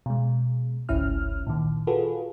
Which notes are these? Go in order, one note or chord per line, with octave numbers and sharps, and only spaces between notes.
B2 G#3
G1 C#2 G#2 C#4 E4 F6
A#2 D#3
F4 F#4 G#4 A4 B4